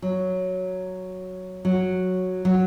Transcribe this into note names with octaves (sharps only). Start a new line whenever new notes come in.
F#3
F#3
F#3